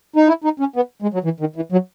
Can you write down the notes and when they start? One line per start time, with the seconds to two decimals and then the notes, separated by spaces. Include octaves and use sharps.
0.16 D#4
0.28 E4
0.44 D#4
0.60 C#4
0.76 B3
1.02 G#3
1.14 F#3
1.24 E3
1.40 D#3
1.56 E3
1.72 F#3